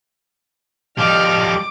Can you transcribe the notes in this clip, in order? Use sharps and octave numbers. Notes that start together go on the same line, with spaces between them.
F3 G3 D#5 D6 F6